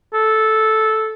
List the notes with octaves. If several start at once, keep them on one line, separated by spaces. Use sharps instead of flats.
A4